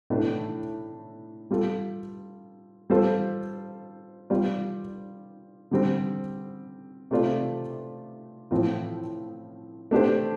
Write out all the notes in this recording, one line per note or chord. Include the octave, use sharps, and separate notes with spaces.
A2 A3 D4
G3 F4 A4
G3 F4 A4 C5
G3 F4 D5
D3 G3 C4
C3 A3 F4 D5
A2 F3 C4 F4
A3 D4 G4 C5